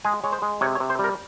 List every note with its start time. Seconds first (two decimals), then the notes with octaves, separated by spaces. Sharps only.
0.04 G#3 G#4
0.24 G#3 C#5
0.32 C5
0.42 G#3
0.61 C3 C#5
0.75 C#5
0.80 C3
0.90 C5
0.99 G3 A#4